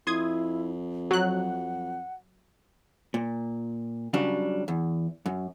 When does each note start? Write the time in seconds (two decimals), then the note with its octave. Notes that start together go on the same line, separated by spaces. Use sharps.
0.07 F2 E4 C6 D#6 G#6
1.11 F#3 F#5 F#6
3.14 A#2
4.13 C#3 F#3 G3 D4
4.68 E2
5.26 F#2